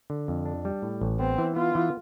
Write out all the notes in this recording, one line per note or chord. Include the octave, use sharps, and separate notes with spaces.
D3
F2
D4
G3
A2
A1
B3 C4
E3
B3 F4
E3